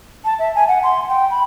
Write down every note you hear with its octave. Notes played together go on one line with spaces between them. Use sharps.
A5
E5
G#5
F#5
C6
G5
B5